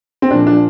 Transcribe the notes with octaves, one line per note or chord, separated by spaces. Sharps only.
C4
A#2 F3 D4
D4